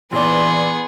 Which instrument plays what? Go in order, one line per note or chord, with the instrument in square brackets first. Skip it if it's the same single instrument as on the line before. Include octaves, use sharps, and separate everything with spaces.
[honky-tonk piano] A#1 D5 [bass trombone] E3 [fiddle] B3 G#4 [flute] C6